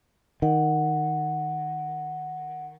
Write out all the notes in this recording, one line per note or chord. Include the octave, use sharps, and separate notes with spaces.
D#3 F#5